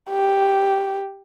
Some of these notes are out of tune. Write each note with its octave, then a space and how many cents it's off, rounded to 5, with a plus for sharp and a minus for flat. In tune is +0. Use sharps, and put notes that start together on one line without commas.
G4 +0